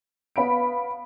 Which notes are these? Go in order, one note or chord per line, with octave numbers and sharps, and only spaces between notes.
B3 F5 B5 D7